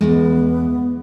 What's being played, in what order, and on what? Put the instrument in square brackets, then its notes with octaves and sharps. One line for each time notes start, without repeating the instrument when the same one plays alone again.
[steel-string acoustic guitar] E2 [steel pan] G#3 [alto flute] B3